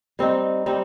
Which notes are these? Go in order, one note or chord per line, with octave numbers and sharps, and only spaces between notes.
G3 C4 D#4
G3 C4 D#4